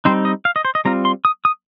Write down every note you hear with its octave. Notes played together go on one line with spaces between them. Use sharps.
G3 C4 D#4 C5
D#5
F5
D#5
C5
D#5
G3 C4 F4 A#5
C6
D#6
D#6